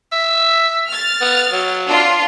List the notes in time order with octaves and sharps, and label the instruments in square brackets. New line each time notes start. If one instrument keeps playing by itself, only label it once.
[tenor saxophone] E5
[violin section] F6 A6
[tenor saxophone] B3
F#3
[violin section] D4 F4